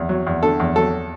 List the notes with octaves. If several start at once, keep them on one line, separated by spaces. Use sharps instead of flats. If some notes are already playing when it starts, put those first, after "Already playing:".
Already playing: E2
F#3
E2
D3 A4
E2
F#3 A4